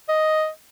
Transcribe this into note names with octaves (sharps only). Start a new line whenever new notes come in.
D#5